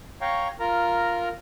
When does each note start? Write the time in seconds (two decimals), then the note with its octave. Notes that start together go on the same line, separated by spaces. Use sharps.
0.21 C#5 F5 G5 A#5 C#6
0.60 F4 A#4 A#5